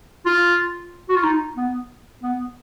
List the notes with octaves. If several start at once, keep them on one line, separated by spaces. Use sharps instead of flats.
F4
F#4
F4
D#4
B3
B3